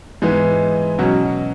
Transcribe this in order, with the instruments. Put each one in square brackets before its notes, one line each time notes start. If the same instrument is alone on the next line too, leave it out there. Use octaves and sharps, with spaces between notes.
[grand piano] G#2 E3 G#3 B3
B2 F#3 C#4 F#4